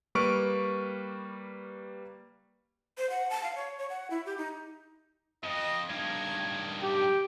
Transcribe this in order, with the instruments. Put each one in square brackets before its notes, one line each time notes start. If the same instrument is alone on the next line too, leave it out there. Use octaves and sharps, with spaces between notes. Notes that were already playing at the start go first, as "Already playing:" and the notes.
[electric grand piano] G3 A#3 B4 C#6 F6 D7
[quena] C5
F#5
A5
F5
C#5
C#5
F#5
E4
G4
D#4
[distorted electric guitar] F2 [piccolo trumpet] D#5
[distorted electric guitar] G2 D#3 [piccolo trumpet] G#6
[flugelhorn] G4 [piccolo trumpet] G5